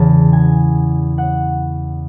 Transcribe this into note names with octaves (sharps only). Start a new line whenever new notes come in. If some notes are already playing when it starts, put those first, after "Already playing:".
Already playing: E2 C#3 E3 A5
G#5
F#5